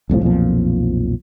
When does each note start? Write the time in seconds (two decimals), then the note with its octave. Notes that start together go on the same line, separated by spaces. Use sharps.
0.10 E1 C2 A2 F3
0.22 B1 F2 A#2 F3